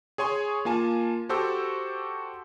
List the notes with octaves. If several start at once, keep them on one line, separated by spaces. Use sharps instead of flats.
G#4 C#5 G#5 C6
A#3 F4 G#5 A5
F#4 G4 A4 C5 C#6 E6